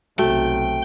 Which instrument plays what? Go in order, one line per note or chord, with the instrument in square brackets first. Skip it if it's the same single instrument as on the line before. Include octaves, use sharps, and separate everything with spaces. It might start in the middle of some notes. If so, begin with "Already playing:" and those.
[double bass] B1 C3 [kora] A3 [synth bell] F#4 [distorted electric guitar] G5